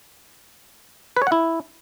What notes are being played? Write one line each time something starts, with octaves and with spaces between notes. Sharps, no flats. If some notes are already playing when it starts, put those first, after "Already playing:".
B4
C#5
F#5
E4